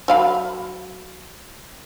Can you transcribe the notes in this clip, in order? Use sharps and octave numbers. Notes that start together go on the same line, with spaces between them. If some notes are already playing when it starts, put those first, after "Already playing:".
F#3 F5 B5